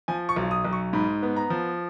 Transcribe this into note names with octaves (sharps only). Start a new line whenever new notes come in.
F3 G#5
C#6
B1
D#6
B1
C#6
G#2 B5
B3
A#5
F3